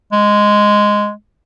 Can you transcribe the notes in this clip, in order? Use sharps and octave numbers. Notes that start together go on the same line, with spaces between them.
G#3